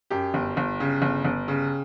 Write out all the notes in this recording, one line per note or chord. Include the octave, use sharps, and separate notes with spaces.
F#2 G4
G1
G1
C#3
G1
G1
C#3